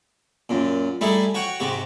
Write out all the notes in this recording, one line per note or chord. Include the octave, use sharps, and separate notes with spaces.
F#2 A#2
G3 A3 D#4 E4 G#4 A4
F#4 C#5 F#5 G5
G#2 C3 F#4 G4